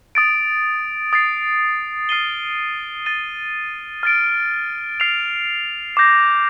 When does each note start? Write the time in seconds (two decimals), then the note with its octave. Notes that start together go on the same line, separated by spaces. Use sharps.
0.15 D#6 A6 D7
1.13 D#6 A6 C7
2.09 F6 C7 D#7 G7
3.06 A6 D#7 G7
4.03 F6 A6 D7
5.00 F6 C7 F7
5.97 D6 G6 A#6